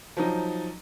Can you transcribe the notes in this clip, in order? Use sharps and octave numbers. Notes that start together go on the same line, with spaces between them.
F3 F#3 D#4